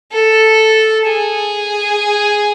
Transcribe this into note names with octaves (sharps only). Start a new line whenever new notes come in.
A4
G#4